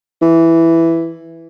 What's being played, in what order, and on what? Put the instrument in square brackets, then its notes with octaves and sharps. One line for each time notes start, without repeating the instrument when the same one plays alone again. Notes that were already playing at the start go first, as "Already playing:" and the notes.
[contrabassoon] E3